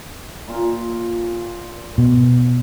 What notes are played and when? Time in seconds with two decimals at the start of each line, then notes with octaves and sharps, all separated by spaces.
0.48 A#2 F4
1.98 B2